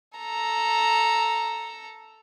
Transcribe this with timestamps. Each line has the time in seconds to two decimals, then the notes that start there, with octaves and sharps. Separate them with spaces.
0.18 A4 A#5